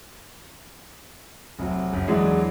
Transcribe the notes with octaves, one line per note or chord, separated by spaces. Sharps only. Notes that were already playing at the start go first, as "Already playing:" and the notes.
F1 F#3
F#1
E2 E3 F#3 G#3 D4